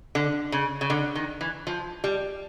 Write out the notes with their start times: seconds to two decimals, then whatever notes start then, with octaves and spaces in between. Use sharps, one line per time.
0.15 D3
0.52 C#3
0.81 C#3
0.90 D3
1.15 D#3
1.41 E3
1.67 F3
2.04 G3